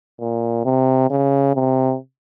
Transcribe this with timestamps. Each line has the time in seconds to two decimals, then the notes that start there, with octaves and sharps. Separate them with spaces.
0.20 A#2
0.65 C3
1.10 C#3
1.55 C3